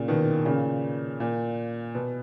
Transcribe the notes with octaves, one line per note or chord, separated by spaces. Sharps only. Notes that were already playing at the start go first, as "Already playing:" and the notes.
Already playing: A#2 C#3
B2 D#3
A#2 C#3
A#2
B2